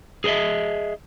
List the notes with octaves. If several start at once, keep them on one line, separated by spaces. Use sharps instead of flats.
G#4 A#4 C5 D#5 E5